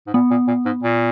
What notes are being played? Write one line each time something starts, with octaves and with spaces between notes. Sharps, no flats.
G#2
A#2 B3
A#2
A#2
G#2
A#2